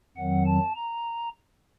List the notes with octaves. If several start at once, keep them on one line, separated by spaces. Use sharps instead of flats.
F2 D#3 F#3 C4 F#5
A5
A#5